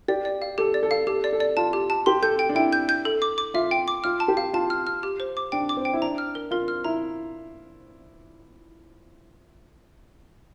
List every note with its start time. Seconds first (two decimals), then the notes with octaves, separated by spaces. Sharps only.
0.08 G4 D5
0.25 D5
0.42 F5
0.58 G4 A4
0.74 D5
0.83 A4
0.91 F5
1.07 G4 A4
1.24 D5
1.33 A4
1.40 D5
1.57 F4 A5
1.73 G4
1.90 A5
2.06 G4 C6
2.22 A4 G6
2.39 G5
2.49 D4
2.55 E4 G5
2.73 G6
2.89 G6
3.05 A4
3.22 D6
3.38 D6
3.54 F4 E5
3.71 G5
3.88 D6
4.04 F4 F6
4.20 A5
4.28 G4
4.37 F5
4.54 F4 A5
4.70 F6
4.87 F6
5.03 G4
5.20 C5
5.37 D6
5.52 D4 G5
5.69 D6
5.77 C4
5.85 G5
5.93 E4
6.02 D4 A#5
6.18 F6
6.35 A#4
6.51 F4 A#4
6.68 F6
6.84 E4 A#5